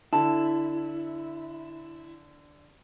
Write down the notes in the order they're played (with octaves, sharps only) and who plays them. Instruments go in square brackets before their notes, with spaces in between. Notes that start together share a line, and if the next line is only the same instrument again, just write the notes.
[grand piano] D3 [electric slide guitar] E4 [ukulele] A5